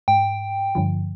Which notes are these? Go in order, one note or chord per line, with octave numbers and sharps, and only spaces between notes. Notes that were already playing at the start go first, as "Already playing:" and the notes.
G#2 G5
G2 D3 F3